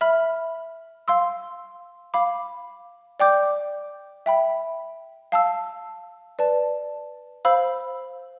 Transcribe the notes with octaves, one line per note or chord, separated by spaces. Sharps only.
E5 B5 F6
F5 C6 E6
F5 B5 D6
D5 G5 D6 G6
E5 G5 B5
F5 A5 E6
B4 D5 A5
C5 F5 B5 E6